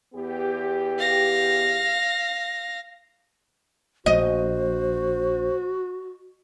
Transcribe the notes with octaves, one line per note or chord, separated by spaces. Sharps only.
E2 B3 G4
F5 A#6
A#1 F#4 C5 D#5